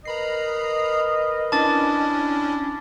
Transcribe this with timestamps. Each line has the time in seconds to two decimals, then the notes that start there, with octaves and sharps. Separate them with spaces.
0.05 A#4 B4 D#5 A#5 B5 C7
1.52 C#4 D4 E4 A5 D6 A6